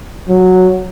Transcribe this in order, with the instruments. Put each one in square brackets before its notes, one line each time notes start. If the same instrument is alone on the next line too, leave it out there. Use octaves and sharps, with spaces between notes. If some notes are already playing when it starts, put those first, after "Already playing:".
[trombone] F#3